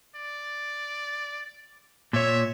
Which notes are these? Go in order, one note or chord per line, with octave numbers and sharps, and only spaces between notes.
D5
A#2 C#5 E5